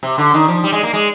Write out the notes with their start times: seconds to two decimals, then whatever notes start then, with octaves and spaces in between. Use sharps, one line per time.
0.03 C3
0.18 D3
0.34 D#3
0.48 F3
0.64 G3
0.73 G#3
0.83 A#3
0.93 G#3